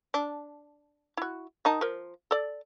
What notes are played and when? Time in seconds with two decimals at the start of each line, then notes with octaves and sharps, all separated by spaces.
0.14 D4
1.17 E4 F#4
1.65 D#3 D#4 A5
1.81 F3 A#4
2.31 A4 D5